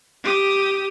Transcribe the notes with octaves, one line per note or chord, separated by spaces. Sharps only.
G4 D#6